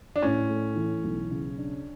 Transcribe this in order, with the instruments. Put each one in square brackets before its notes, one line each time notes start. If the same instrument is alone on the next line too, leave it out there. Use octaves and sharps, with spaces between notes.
[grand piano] D4
[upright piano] A2 [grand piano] C#4
[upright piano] A3
E3
B1
C#3
D4